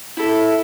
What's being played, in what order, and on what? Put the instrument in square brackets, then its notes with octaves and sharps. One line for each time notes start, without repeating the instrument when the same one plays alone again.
[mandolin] E4 A4